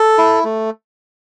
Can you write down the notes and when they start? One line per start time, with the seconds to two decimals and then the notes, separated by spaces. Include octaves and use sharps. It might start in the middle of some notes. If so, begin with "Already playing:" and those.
Already playing: A4
0.18 E4
0.44 A3